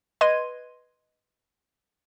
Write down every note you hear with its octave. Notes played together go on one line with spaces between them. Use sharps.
B4 D#5 C6 G#6 D#7